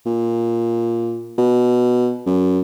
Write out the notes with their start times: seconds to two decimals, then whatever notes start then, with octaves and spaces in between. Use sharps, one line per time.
0.06 A#2
1.38 B2
2.26 F#2